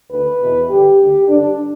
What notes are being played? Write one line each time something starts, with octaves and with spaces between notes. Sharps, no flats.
D2 D3 B4
E2 B2
G2 D3 G4
D2 D3
G2 D3 D4